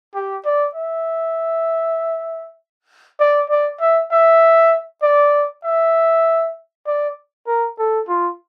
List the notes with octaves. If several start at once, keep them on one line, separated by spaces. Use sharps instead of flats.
G4
D5
E5
D5
D5
E5
E5
D5
E5
D5
A#4
A4
F4